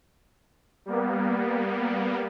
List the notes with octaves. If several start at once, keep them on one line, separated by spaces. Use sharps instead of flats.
G3 A#3 B3